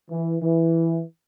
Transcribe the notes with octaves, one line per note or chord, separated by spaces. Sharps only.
E3
E3